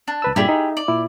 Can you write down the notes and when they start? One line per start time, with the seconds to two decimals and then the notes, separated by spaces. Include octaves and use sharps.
0.08 D4
0.22 C#2 B4 E6
0.36 G2 A#2 E4 G4 G#4 D5
0.49 D#4
0.77 D5
0.88 A#2 E4